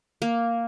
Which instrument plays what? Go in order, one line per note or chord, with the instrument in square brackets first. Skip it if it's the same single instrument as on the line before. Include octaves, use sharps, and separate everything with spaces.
[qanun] A#3